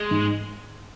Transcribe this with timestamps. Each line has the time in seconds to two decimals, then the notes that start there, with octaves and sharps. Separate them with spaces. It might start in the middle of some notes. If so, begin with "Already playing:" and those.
Already playing: G#3
0.11 G#2